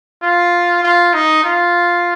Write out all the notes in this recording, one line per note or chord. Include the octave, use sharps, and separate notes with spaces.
F4
F4
D#4
F4